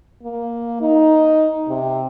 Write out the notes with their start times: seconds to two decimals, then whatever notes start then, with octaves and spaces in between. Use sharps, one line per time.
0.23 A#3
0.81 D#4
1.68 C3